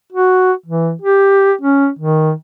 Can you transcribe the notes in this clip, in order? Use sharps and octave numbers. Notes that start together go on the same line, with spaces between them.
F#4
E3
G4
C#4
D#3